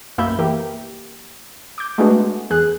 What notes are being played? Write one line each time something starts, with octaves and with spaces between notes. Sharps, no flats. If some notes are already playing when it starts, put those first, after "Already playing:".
B1 F#2 A#3 E5 B5 G6
E3 A#3 G4
D6 G6
G#3 A3 B3 D4 F#4
E2 G#4 F#6